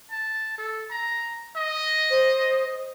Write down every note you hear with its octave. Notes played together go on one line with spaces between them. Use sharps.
A5
A4
A#5
D#5
C5